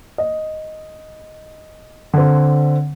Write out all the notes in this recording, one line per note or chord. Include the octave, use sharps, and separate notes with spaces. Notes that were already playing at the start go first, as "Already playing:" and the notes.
D#5
D3 C4